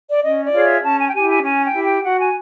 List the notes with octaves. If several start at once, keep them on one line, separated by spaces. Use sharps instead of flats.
D5
C#4 D#5
D5
F4 G#4 C#5 F5
E5
C#4 A5
G#5
G5
E4 G4 G#5
G#5
C#4 G#5
G5
E4 G4
G5
F#4 F#5
G#5